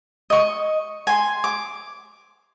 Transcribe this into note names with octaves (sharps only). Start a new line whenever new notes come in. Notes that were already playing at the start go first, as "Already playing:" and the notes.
D#5 C#6
G#5 C6
D6